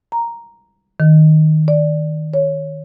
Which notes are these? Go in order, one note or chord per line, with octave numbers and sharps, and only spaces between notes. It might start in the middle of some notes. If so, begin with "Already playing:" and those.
A#5
D#3
D5
C#5